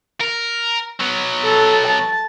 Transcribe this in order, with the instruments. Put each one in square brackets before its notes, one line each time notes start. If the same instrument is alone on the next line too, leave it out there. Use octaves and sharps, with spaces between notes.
[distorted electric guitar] A#4
F#3 B3
[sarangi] A4
A5